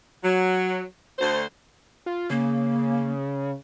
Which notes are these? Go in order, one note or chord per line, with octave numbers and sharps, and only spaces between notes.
F#3
D2 C5
F4
C#3 A#3